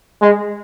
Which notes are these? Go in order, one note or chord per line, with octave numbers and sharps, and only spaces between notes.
G#3